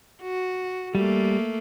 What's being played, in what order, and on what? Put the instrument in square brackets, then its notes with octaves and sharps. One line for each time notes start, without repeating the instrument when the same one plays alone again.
[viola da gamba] F#4
[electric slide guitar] G3 [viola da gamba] A3 A#3